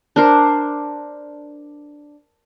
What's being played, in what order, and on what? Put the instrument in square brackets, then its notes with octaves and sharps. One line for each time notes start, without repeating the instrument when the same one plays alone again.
[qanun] D4 A#4 C5